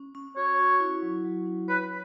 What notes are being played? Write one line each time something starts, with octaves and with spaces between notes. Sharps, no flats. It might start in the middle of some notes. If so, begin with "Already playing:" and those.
Already playing: C#4
C#4
F#4 C#5
F#4
E4
F#3
F#3
C#4
B4 C#5